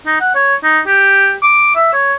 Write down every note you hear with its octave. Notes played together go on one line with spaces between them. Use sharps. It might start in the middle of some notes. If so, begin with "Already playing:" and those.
D#4
F#5
C#5
D#4
G4
D6
E5
C#5